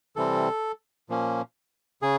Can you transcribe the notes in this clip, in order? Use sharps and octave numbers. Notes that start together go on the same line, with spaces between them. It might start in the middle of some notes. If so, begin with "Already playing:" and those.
C3 E3 G3 C4 A4
A#2 F3 A#3 C#4
C#3 G#4